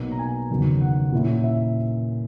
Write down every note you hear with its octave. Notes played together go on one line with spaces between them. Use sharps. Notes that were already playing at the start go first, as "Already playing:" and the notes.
Already playing: B1 B2 A#3 D#4
A#5
G#5
F#1 E2 D#3 F#3
F#5
A#2 A#3 C#4 E4
E5